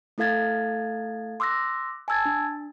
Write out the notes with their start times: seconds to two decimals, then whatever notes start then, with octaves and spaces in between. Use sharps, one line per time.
0.18 A3 E4 A4 F5 G#6 A6
1.40 C6 D6 E6 F#6 A#6
2.08 G#5 A5 E6 G#6 A6
2.25 D4